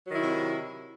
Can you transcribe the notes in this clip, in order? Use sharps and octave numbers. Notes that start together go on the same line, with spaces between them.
C3 D#3 F#3 E4